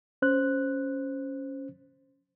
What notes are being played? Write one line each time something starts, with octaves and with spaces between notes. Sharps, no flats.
C#4 C5 F#6